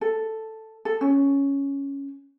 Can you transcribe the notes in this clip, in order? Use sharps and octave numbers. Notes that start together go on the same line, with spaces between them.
A4
A4
C#4